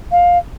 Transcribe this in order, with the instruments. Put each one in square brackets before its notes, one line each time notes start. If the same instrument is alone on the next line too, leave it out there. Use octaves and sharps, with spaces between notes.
[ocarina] F5